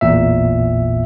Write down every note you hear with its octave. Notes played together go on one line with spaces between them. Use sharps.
A1 E2 A#2 E5